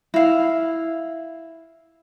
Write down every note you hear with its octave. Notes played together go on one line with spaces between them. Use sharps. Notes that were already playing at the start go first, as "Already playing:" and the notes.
E4 F5